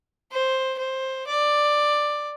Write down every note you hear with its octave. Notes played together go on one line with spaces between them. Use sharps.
C5
C5
D5